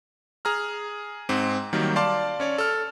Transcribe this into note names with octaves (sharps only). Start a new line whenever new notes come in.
G#4 A#5 F6
G#2 C4
D#3 F#3 G3 A#3
D5 F5 A5 C6 D6
C#4 C#5 D5
A4 F6